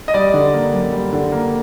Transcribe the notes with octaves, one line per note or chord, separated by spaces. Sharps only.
D#5
G3 D5
D3
A#3
F#2
G3
D3
A#3